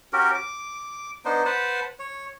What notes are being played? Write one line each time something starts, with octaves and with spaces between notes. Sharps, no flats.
C#4 F#4 G4 A#4
D6
B3 D4 D#4 C5
B4 C5 F#5 A5
C#5